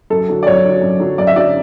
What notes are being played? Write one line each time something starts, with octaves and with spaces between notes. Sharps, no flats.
F#2 A4
D3 F#3
D5
F#2 C#5
D3 F#3
F#2
D3 F#3
F#2 D5
E5
D3 F#3 D5